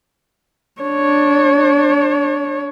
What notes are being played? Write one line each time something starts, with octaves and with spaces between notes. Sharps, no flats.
D4 C#5